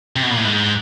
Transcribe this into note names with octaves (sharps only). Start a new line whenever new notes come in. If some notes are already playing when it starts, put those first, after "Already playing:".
C3
B2
A#2
A2
G#2